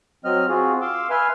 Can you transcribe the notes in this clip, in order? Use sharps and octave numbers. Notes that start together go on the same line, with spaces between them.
F#3 C4 D#5 F6
C4 F4 F#4 G#4
F5 C6 D6 E6
B4 E5 G#5 C6 F6